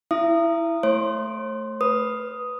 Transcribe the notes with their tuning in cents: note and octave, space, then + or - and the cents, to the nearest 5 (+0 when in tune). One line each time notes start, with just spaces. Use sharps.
E4 +0 E5 +35 D#6 -15
A3 +0 C#5 -45 C6 +0
B4 +5 D#6 +0